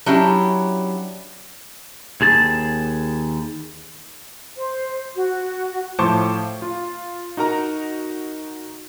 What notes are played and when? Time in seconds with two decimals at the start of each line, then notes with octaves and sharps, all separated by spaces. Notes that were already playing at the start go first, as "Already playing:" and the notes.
0.06 F#3 C#4 D4 E4 G4
2.21 D#2 G#4 A5
4.57 C5
5.16 F#4
5.99 A2 F3 C5 A5 C#6 D6
6.62 F4
7.37 D#4 F#4 A#4 A#5